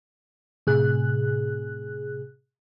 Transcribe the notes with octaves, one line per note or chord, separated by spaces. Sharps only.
A2 C3 G#4 F#6